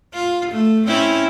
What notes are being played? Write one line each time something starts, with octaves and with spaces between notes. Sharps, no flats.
F4
A3
C4 C#4 E4